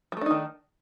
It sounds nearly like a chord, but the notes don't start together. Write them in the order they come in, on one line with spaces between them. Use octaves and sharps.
G3 A3 D4 D#4 D#3